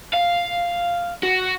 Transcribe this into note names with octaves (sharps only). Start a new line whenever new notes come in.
F5
F#4